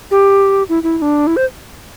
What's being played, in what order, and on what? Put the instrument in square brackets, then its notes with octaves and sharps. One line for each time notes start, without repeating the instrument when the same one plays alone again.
[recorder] G4
E4
E4
E4
D4
E4
C5